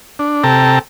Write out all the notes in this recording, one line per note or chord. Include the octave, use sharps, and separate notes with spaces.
D4
C3 A4 G5 A5 A#5